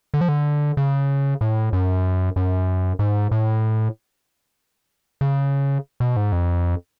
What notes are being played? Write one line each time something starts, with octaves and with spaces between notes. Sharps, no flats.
D3
F3
D3
C#3
A2
F#2
F#2
G#2
A2
C#3
B2
G#2
F2